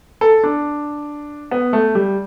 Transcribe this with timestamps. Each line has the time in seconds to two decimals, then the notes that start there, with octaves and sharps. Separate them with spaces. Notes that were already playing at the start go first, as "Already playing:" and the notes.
0.21 A4
0.44 D4
1.51 B3
1.73 A3
1.95 G3